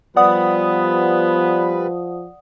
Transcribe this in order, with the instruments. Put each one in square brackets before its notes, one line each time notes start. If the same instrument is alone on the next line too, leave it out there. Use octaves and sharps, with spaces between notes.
[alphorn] F3 [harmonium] G3 B4 [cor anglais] B3 [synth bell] D5 F#5 D#6